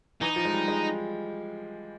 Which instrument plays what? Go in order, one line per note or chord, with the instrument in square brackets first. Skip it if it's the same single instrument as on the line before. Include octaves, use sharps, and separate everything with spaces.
[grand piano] E3 [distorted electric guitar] D#4
[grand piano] F3
G#3
G3
G#3